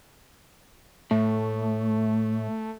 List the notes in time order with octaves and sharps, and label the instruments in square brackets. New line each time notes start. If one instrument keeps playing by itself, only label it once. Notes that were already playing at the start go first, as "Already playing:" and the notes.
[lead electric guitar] A2 [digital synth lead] A3